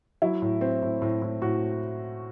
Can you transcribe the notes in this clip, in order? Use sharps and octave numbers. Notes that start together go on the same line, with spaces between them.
F#3 E4
A2
C4
A2
A2
A2
A2 F#4